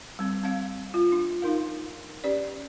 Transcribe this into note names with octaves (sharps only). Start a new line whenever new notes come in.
G3 C4
C4 F5
F4
D4
D#4 A#4 F5
C#4 G4 B4 D5